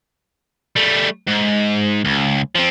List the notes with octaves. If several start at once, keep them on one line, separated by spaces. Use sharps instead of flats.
G3 A3
G#2
C#2
F3 C4